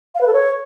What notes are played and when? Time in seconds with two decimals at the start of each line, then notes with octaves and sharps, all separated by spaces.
0.15 F5
0.21 B4
0.27 A4
0.33 C#5